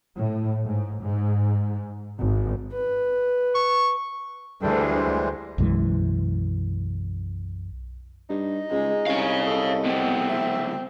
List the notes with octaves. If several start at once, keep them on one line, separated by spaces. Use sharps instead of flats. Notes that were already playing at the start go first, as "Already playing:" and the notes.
A2
G#2
G#2
G#1
B4
C#6
D2 E3 G3 G#3 D4 A4 G5
C5
B1 F#2 E3 G#3
G2 D#4
C#2 G#3
C2 C#4 C#5 F5
A4 D#5
C#2 B3 C4
E5